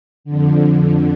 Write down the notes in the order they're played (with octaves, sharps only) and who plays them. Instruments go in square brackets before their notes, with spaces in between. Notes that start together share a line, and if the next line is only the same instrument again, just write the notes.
[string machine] F2 D3